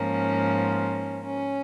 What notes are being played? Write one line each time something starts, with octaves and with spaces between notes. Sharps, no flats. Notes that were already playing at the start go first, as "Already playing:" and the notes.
Already playing: G#2 F3 A#3 C#4
C#4